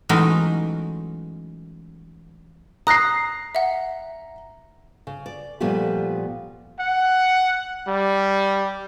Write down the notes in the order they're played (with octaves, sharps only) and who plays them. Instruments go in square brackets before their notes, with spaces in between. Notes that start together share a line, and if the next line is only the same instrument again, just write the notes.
[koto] E3 F#3 G#3 A3 C#4 D#4
[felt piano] A#5 C7 [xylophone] D#6 F#6 A#6
[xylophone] E5 F#5
[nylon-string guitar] C#3
D5
A#2 F3 G3 A3 B3 G4
[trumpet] F#5
G3